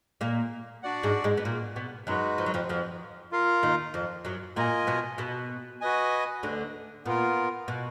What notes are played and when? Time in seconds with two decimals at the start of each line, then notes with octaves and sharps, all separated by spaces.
0.21 A#2 A#3
0.83 D4 F#4 D5 F#5
1.03 G#2 G#3
1.24 G#2 G#3
1.37 B3
1.45 A#2 A#3
1.76 B2 B3
2.07 F#2 F#3 G#3 D#4 F#4 B4
2.38 F3
2.46 F#3
2.54 F2 F3
2.69 F2 F3
3.32 F4 A#4 F5
3.63 D#2 D#3
3.94 F2 F3
4.25 F#2 F#3
4.56 A#2 A#3 F4 A#4 D#5 G#5
4.87 B2 B3
5.18 B2 B3
5.81 F#4 B4 D#5 G#5
6.43 D2 D3
7.05 A#2 B3 F4 A#4
7.68 B2